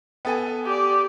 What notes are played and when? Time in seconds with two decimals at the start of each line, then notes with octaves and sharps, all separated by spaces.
0.25 B3 A4 G#5
0.65 G4 D5